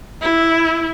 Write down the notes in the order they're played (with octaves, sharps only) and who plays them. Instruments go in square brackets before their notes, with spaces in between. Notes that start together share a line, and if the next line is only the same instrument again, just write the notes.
[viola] E4